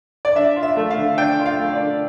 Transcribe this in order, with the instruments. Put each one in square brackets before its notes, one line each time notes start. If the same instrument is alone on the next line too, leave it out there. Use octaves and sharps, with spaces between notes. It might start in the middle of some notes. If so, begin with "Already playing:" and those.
[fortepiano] D5
D4 E5
F4
E5
A3
F5
D3
D4 G5
F4
F5
A3
D5
D3